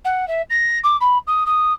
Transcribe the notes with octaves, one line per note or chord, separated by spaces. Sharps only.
F#5
E5
A#6
D6
B5
D#6
D#6